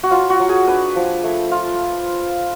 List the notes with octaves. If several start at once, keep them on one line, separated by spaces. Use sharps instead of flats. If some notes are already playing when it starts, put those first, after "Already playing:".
F#4
F#3 F4
F#4
F#3
G#4
D4 B4
F3
A3
F4